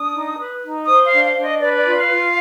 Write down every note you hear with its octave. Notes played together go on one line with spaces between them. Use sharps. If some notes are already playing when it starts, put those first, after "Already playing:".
Already playing: D4 D#6
D#4
B4
D#4
C5 D#6
F5
D4
F5
D4
D#5
B4 D5
D5
F4
F5
F4